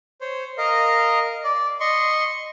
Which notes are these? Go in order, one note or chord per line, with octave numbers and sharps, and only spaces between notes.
C5 C#5
A#4 D#5 F5
D5
D#5 C6 C#6